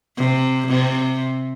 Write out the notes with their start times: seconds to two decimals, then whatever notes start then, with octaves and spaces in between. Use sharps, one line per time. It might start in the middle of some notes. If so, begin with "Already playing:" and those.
0.17 C3
0.68 C3